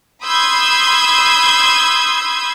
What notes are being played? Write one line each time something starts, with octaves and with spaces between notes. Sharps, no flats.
B5 C6 D#6 E6 G6 G#6